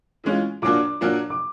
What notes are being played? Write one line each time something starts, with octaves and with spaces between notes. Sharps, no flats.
A2 E3 G#3 C#4 F4
A#2 F#3 A#3 D4 D6
A#2 F#3 A#3 D4
D6